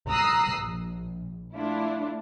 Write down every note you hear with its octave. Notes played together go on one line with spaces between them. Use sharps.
A#5 D#6 E6 F#6 C7
A#1
A3 D4 E4 F4